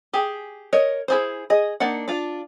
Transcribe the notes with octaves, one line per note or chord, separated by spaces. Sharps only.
G4 G#4
A#4 C#5 D#5
E4 G#4 C5
G#4 D#5
A#3 D4 D#4 F#5
D4 F4